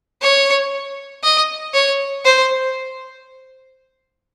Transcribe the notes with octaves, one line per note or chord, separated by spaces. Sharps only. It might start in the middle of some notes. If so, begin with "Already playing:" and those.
C#5
D#5
C#5
C5